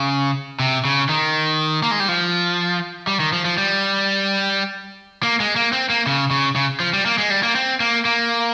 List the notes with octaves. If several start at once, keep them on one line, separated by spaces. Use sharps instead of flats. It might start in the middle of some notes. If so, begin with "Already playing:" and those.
Already playing: C#3
C3
C#3
D#3
A#3
G#3
G3
F3
G3
D#3
F3
F3
G3
A#3
G#3
A#3
C4
A#3
C#3
C#3
C#3
F3
G3
A#3
G#3
G3
A#3
C4
A#3
A#3